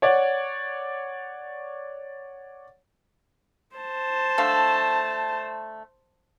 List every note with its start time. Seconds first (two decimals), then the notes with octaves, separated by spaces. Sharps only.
0.02 C#5 D5 F#5
3.77 C5 A5
4.38 D3 A3 F5